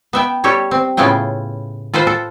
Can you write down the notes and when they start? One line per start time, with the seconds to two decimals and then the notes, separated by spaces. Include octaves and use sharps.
0.13 B3 E5 G5
0.44 G3 G4 A4 C#5
0.71 C4
0.97 A2 C#3 B3 E4 F4 G5
1.94 F4 A4 B4 C5
2.07 A4